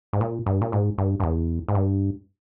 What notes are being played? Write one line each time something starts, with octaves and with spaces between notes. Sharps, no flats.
G#2
A#2
G2
A#2
G#2
G2
G2
E2
G#2
G2